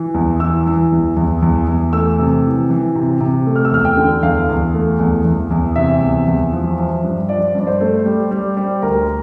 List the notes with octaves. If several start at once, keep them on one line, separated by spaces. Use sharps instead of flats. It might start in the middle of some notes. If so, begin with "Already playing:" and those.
Already playing: E3
E2
E3 E6
E3
E2
E2
E2
E2
A3 E6
C3
E3
E3
C3
C3
A3
F6
E6
E2 F6
G5
D3
E2 F5
E2
A3
E2
E2
E2
C3 E5
E2
E2
F3
F3
G2
F3 D5
G2 D5
C5
A3
G3
G3
G3
D2 A#4